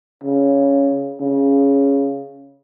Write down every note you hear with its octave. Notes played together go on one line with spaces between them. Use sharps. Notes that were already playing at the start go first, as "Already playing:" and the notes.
C#3
C#3